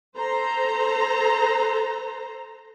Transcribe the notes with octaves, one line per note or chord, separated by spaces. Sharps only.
A4 C5 A#5